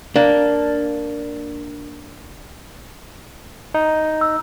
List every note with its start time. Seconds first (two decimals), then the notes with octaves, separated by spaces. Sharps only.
0.16 A#3 D4
3.74 D#4
4.21 E6